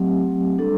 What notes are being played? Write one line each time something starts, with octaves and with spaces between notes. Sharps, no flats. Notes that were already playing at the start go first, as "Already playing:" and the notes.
Already playing: F#3 A3 C4 G4
G3 D4 A4